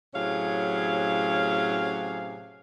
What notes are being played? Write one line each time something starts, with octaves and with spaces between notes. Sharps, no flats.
A2 C3 F#3 C#4 G#4 F5